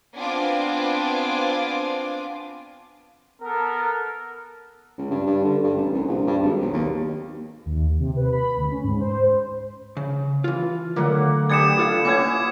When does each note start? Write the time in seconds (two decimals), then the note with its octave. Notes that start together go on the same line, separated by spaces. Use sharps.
0.17 B3 C4 D4 F4 G#5 D6
3.42 B3 A4 A#4
4.98 C#2
5.11 G2
5.27 G2
5.44 D3
5.63 G2
5.76 A1
5.93 C2
6.08 A#1
6.27 G2
6.42 G#1
6.61 B1
6.73 D#2
7.66 D#2
8.00 C3
8.16 B4
8.32 B5
8.57 D2
8.72 C#4
8.84 G#2
9.01 C5
9.97 C#3
10.44 E3 F4
10.96 D3 F#3 A3 A#3 F#5
11.50 B3 D4 G4 G#6 C#7 E7
11.79 F4 A4 F5
12.05 A#3 B3 C#4 E4 C#5 D6 G#6